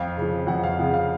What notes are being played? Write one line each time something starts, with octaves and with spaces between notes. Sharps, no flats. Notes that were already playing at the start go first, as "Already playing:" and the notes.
Already playing: F2 F5
C#3 F3
F2 F#5
F5
C#3 F3 F#5
F5